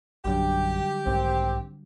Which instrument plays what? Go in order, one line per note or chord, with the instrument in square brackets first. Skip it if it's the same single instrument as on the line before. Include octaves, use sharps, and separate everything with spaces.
[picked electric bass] A#1 F#2 [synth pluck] D3 F#3 G3 [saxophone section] G4
[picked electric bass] B1 G#2 D#3 [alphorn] C4